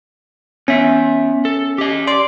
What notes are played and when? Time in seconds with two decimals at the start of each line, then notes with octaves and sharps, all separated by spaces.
0.68 B3 C#4 E5
1.45 A4
1.78 G4 D#5
2.07 D5 C6